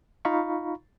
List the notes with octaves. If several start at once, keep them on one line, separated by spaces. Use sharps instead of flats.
D#4 F4 F5 A#5 B5 C#6